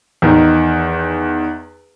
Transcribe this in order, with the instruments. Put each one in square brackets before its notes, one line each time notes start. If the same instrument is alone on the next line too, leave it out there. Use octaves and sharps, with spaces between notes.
[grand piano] E2 D#3